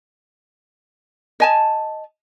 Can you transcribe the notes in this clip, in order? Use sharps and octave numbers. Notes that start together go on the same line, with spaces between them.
D#5 G#5 A5